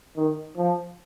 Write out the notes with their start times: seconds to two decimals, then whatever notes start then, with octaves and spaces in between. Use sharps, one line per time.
0.17 D#3
0.57 F3